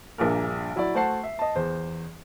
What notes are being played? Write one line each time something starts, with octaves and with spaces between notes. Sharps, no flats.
A#1 G2 A#2 A#4
F#3 E4 F#4 D5
A3 F#4 C5 F#5 A5 C7
E5
D#5 A5
E2 C5